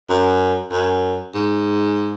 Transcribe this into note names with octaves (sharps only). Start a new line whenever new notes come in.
F#2
F#2
G#2